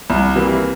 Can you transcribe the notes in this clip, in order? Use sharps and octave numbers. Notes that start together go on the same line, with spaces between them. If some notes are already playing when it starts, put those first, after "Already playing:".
C2
C3 E3 G3 A#3